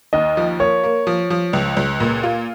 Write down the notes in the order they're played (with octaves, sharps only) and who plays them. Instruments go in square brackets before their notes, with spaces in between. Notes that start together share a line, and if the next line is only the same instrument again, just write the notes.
[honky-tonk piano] D#2 [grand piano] D#5
[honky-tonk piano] F3
[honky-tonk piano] A#3 [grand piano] C#5
[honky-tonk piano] A#3
F3
F3
C#2
C#2
A#2
F4